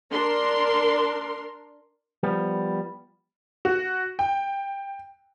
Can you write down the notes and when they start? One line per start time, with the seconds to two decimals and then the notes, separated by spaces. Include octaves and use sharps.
0.10 D4 A#4 C6
2.23 F3 G3 B3
3.65 F#4
4.19 G5